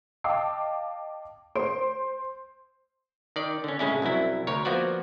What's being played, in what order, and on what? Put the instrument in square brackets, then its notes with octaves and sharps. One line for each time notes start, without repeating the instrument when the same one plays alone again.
[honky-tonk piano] D#5 F5 G5 A5 D6 C7
C5 C6 D7
[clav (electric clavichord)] D#3 D5
D3 C#4
A2 C#3 G#3 C#4 E4
C2 F#2 F#3 E4
D2 A#4 C#5
F3 A#3 B3 F#4 D5